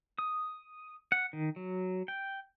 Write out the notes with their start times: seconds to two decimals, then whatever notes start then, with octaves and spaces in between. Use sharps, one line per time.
0.19 D#6
1.12 F#5
1.33 D#3
1.56 F#3
2.08 G5